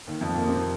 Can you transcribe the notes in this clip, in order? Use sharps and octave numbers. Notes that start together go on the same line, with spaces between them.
D#2 D#3
F2 F3
A#2 A#3
C3 C4